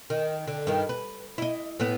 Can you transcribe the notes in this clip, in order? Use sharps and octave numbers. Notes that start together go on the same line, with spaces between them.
D#3
D3
G2 D#3
B4
E4 D#5
A2 B3